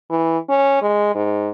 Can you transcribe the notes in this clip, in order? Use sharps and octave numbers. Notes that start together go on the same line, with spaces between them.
E3
C#4
G#3
G#2